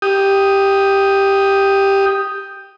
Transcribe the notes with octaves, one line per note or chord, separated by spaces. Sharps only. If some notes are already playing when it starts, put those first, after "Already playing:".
G4 D#6